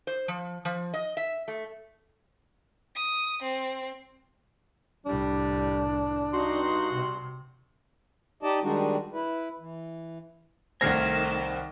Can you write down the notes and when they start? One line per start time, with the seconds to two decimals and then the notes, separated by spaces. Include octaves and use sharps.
0.07 C5
0.28 F3
0.65 F3
0.94 D#5
1.17 E5
1.48 A3
2.95 D#6
3.42 C4
5.06 C2 A2 G3 D4
6.33 G2 D#4 F#4 C6
6.93 C3
8.43 D#4 G4 D5 D#5 A5
8.62 D#3 G3 G#3 D4 D#4 F#4
9.13 E4 B4
9.60 E3
10.81 C2 D#3 A3 C4 F5 G#5 A#6